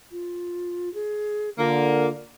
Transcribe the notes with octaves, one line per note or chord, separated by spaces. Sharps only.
F4
G#4
D3 A#3 F4